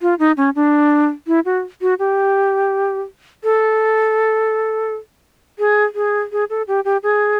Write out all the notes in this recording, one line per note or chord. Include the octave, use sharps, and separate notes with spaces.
F4
D#4
C#4
D4
E4
F#4
F#4
G4
A4
G#4
G#4
G#4
A4
G4
G4
G#4